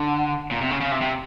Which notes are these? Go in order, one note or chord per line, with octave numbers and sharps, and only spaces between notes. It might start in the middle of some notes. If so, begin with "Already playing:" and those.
Already playing: D3
A#2
C3
C#3
C#3
C3
C3